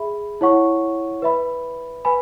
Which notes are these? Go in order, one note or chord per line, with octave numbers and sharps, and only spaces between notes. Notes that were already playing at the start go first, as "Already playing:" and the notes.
Already playing: G#4 E5 B5
E4 C#5 F#5 C#6
B4 E5 B5
B4 G#5 B5